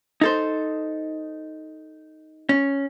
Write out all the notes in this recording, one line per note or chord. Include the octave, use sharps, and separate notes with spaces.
D#4 A4 C5
C#4